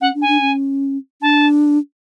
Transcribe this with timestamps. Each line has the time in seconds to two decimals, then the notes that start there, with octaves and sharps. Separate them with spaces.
0.01 C#4 F#5
0.15 D4
0.21 G#5
0.28 D4
0.41 C#4
1.22 D4 A5